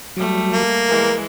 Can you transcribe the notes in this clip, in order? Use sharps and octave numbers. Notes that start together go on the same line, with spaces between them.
F#3 G3 A3
A#3
E3 G#3 A#4